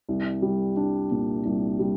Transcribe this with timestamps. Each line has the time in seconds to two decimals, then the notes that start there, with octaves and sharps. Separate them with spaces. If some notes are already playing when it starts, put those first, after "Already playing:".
0.09 C2
0.42 G3
0.77 D4
1.11 A#2
1.45 C2
1.79 G3